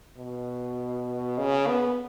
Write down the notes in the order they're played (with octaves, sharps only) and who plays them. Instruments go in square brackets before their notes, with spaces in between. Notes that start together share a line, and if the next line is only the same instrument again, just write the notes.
[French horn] B2
C#3
B3